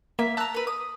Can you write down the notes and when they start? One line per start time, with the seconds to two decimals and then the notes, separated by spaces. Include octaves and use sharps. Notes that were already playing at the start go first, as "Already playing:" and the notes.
0.19 A#3 E5
0.37 A5 A#5 E6 F#6
0.54 A#4 B4
0.67 D#6